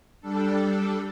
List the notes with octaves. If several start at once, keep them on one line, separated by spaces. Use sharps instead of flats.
G3 D4 A4